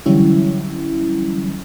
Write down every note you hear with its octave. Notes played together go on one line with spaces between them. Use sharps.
D3 E3 F#3 G3 C#4 E4